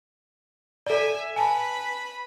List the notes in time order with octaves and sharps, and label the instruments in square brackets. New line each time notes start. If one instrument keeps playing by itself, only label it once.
[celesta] A4 D5 [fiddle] E5 G#5
[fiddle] B4 B5 [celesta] G#5 A5